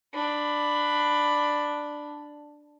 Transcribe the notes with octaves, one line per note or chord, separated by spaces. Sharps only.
D4 B5